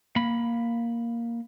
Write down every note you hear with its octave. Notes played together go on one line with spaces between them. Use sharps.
A#3 B5